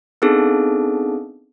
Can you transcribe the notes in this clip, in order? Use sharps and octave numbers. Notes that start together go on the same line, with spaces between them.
B3 C4 D4 D#4 G#4 A4